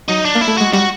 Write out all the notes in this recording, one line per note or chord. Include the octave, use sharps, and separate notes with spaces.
F#3 D#4
D4
A#3
E4
A3
G#3 F#4
G3 F#4